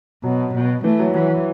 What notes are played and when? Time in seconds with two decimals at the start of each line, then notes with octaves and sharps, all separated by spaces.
0.24 B2 F#3
0.54 B2
0.84 E3 A3
0.99 F#3
1.14 E3 F#3